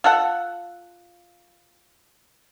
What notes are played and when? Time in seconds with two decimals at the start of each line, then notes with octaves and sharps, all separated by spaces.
0.04 F4 A4 F#5